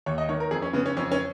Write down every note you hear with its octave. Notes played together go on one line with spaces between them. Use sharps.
D#2 C#5
D#5
D#3 C#5
A#4
F2 G#4
C#4
C#3 B3
C#4
F2 C#4
C#4